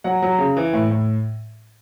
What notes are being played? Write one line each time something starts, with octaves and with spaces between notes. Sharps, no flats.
F#3 F#5
F#3
C#3
E3
A2
A2